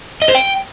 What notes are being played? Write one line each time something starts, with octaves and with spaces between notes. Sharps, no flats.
D#5
C5
G5